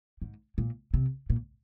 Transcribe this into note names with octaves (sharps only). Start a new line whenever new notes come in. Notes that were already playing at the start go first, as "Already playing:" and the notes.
G#2
A#2
C3
A#2